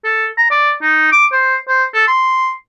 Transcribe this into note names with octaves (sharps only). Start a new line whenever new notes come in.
A4
A#5
D5
D#4
D6
C5
C5
A4
C6